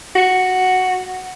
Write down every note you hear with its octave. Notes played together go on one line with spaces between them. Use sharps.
F#4